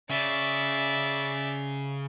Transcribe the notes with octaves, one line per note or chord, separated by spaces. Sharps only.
C#3 D5 E5